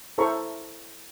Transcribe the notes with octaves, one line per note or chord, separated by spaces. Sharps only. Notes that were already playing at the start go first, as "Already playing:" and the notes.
E4 A4 C5 A#5 C#6